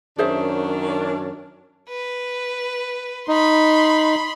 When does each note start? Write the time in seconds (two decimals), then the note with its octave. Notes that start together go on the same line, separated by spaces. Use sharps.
0.19 F#2 D#3 C#4 D4 G#4 C5 E5
1.89 B4
3.28 D#4 B5 C6